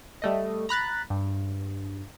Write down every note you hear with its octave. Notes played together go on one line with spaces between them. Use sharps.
G3 A3 D#5
A#5 B5 F#6 A6
G2